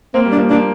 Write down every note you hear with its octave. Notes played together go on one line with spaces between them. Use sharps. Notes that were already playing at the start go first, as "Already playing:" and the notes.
A#3 C4
G3
D4
F3 A#3
F3 A#3 D4